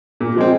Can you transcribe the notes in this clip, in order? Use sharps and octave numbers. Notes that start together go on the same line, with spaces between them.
A#2
F3 G#3 C4